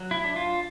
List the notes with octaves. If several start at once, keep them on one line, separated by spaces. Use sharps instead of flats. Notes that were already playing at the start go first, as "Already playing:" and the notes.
Already playing: F#3
E4
D4
F4